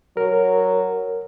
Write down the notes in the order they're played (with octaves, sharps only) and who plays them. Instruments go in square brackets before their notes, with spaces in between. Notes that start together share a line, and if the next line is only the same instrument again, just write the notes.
[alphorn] F#3 [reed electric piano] A#4